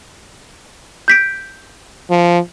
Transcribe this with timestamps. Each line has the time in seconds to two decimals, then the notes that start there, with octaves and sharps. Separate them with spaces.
1.08 G6 B6 D7
2.10 F3